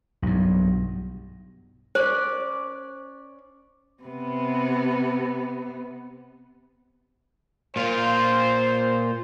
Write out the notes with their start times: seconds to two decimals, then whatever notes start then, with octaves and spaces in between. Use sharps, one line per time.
0.22 B1 G2
1.95 C#4 C5 D5
4.03 C3 B3
7.76 A#2 F4 C5